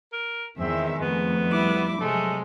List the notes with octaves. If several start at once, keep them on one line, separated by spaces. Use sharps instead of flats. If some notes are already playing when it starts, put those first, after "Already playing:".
A#4
E2 D#3 G#3 C4 E5
F2 A3 B3
G3 E4 D6
C3 F#3 G#3 A3